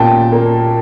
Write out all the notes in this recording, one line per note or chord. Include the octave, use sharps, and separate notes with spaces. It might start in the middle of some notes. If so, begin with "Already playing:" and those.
Already playing: A#2 C#4 G5 A5
A#3